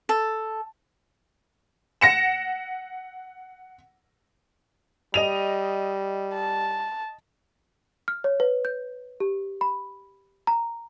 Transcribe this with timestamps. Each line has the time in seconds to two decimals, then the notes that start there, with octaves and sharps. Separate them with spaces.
0.09 A4
2.01 F#5 A#6 C#7 E7
5.14 G3 D#5 D#7 F7
6.34 A5
8.08 F6
8.24 C#5
8.40 B4
8.65 G6
9.20 G4
9.61 B5
10.47 A#5